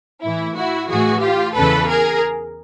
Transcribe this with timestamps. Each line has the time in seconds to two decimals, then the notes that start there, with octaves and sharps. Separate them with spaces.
0.23 A2 E3 E4
0.56 E4 F#4
0.89 A2 E3 F#4 G#4
1.22 F4 G4
1.55 E2 C#3 E3 A4 B4
1.88 G#4 A#4